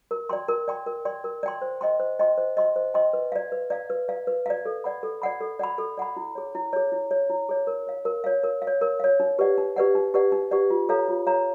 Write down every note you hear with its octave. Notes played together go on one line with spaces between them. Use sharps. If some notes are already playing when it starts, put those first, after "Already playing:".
A#4
D5 G5 C6
A#4
D5 G5 C6
A#4
D5 G5 C6
A#4
D5 G5 C6
C5
D#5 G5 C6
C5
D#5 G5 C6
C5
D#5 G5 C6
C5
D#5 G5 C6
B4
D5 F5
B4
D5 F5
B4
D5 F5
B4
D5 F5
A4
D5 F#5 B5
A4
D5 F#5 B5
A4
D5 F#5 B5
A4
D5 F#5 B5
E4
G#4 C#5
E4
G#4 C#5
E4
G#4 C#5
E4
G#4 C#5
A#4
C#5 F5
A#4
C#5 F5
A#4
F5
C#5
A#4
C#5 F5
D#4
G4 B4 D5 F#5
D#4
G4 B4 D5 F#5
D#4
G4 B4 D5 F#5
D#4
G4 B4 D5 F#5
F4
A4 C#5 F5 A#5
F4
A4 C#5 F5 A#5